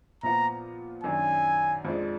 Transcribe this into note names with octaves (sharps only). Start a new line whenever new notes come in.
A#2 F3 B3 F4 A#5
F#2 D#3 F#3 D4 G#5
F2 F3 G#3 D4